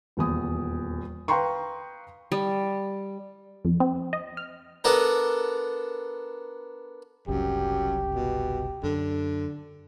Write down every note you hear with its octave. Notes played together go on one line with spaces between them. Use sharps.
D#1 E2 D#6
B4 F5 G5 A#5 C6 C#6
G3
F2
C4
D#5
F6
B3 D4 A4 A#4
F#1 C2 F#2 G4
B2
F#2 D3